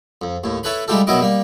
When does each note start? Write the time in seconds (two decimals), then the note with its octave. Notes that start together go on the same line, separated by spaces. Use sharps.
0.22 F2
0.44 D#2 A2
0.63 E4 A4 B4 C#5 B5
0.88 G3 G#3 E4 F4 G4 A4
1.07 B2 D#3 F#3 E4 D#5 D6
1.21 G3 A#3